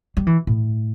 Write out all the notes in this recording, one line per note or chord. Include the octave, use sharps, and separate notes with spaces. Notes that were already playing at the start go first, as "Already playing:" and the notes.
G3
E3
A2